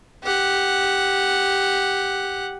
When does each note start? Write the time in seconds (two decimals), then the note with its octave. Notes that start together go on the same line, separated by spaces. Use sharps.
0.24 G4 F#5